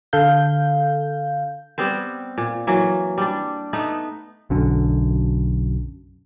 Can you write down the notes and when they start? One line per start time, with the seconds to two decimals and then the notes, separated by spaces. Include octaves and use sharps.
0.13 D3 A4 F5 G6
1.78 G3 B3 C4 C5
2.38 A#2
2.67 E3 F#3 A#3
3.18 G3 D4
3.73 A3 B3 D#4
4.50 B1 F#2 D3